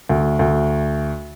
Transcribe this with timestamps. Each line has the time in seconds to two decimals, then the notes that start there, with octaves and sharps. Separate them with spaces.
0.09 D2
0.39 D2